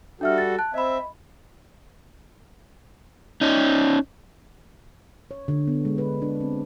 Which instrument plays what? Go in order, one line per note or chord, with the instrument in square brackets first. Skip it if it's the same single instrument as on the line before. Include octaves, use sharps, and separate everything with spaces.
[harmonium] G3 F#4 A4 [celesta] D4 E5 F6
[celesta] A6
A5 F#6
[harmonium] C4 E5 [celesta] D#5 B5
[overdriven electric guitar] C#4 D#4
[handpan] C#5
D3
B3
G#3
B4
D4
C4